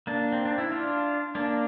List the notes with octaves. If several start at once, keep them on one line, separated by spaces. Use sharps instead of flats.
A#3 D4
C4
D4
E4
D4 F4
A#3 D4